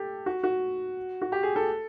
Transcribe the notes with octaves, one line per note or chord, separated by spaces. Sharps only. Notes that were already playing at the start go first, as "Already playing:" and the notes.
Already playing: G4 A4
F#4
F#4
F#4
G4
G#4
A4